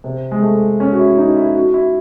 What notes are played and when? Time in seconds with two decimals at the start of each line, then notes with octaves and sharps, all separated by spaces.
0.04 C3
0.31 G#3
0.42 A3
0.80 C#4
0.93 F#4
0.99 E4
1.18 D#4
1.36 E4
1.55 F#4
1.74 E4